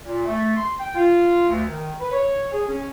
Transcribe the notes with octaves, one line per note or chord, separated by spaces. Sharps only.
A#2
A3
C6
G5
F4
D2
D#3
B4
C#5
G#4
C#4